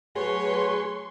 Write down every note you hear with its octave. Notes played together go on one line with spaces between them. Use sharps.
F#3 A3 F#4 G#4 B4 C#5 C6 C#6